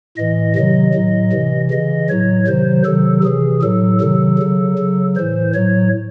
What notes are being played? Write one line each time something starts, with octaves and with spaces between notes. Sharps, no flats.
A2 E3 D#5
C3 D#3 F#3 D#5
A2 F#3
C3 E3
C#3 E3 D#5
A2 F#3 C#5
C3 D#3 F#3 C5
C3 D#3 F#3 A4
C3 E3 G#4
A2 F#3 A4
C3 D#3 F#3 A4
C#3 F#3
C#3 F#3
A2 E3 C5
A2 F#3 C#5